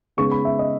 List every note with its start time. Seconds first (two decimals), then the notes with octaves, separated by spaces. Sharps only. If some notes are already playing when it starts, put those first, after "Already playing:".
0.17 C#3 G#3 B3 D#4 C#6
0.32 B5
0.45 E5
0.59 D#5